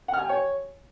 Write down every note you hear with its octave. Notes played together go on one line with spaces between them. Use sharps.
F#5
F6
G#5
G5
C#5